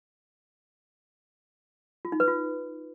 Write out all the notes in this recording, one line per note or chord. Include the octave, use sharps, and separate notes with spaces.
F4
D#4
B4
F4